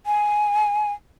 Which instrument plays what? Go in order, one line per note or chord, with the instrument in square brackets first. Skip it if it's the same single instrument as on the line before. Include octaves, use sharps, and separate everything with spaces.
[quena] G#5